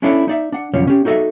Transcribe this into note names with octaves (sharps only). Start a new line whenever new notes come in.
C#4 D4 E4 A4 C#5 D5
D#4 D5 E5
D4 F#5
C2 F#2 D3 F3 C#4 C#5
C#4 G4
D#4 F#4 A4 D#5 E5